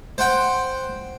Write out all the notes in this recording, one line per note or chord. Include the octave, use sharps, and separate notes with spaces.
C5 F#5 G5